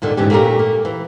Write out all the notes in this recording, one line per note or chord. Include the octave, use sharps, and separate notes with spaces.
D#2 A#2 D3 D#3
D2 G#2 E3 C#4 G4
A#2 A3 A#3 C#4 G4 A#4
A#3
E3